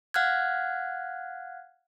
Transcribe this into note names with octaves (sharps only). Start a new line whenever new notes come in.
F5 F#5 F6 F#6 G#6